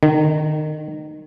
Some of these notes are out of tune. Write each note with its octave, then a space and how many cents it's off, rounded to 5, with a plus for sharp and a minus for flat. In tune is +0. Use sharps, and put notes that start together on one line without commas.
D#3 -25